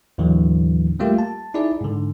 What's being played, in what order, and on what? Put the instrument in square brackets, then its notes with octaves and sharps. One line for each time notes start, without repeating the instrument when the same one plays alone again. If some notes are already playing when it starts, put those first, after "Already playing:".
[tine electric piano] D#2 A2 D3 E3 F#3
G3 A3 A#3 F4 G4
A5
D#4 E4 G#4 D5
G#2 D3